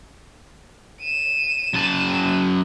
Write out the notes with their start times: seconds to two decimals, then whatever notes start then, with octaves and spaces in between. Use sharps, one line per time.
1.01 D#7 E7
1.74 F#2 A5